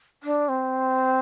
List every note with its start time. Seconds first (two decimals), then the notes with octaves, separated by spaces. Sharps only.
0.23 D4
0.49 C4